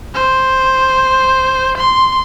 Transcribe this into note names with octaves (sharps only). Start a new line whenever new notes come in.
C5
C6